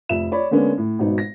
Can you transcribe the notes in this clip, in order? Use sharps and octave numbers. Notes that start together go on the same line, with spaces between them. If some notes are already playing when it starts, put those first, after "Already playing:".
F1 F2 E5 E7
C#5 D5 B5
D3 G#3 A#3 B3 C#4 D4
A2
G#1 B2 D#4
A#6